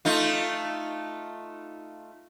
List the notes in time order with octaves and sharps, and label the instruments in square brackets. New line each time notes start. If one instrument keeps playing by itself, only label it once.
[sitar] A3 D#4 F4